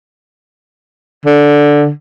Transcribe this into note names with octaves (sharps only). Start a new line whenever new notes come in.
D3